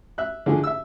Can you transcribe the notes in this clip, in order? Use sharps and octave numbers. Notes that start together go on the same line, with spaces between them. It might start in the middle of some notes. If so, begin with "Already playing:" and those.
E5 F#6
D3 E3 F3 A3 G#4
E5 E6